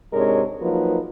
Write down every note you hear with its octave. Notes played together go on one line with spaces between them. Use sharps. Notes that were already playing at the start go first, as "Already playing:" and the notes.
G#2 C3 G#3 D4 A#4 C#5
F3 F#3 A#3 D#4 B4